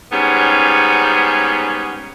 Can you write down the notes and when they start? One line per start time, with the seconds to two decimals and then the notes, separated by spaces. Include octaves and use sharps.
0.12 G#2 G3 B3 C#4